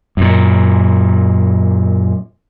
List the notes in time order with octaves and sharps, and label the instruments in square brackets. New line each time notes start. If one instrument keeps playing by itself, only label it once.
[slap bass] F#2 A#2